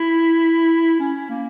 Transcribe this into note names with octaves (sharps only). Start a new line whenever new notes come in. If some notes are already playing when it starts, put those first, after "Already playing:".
Already playing: E4
C#4
A#3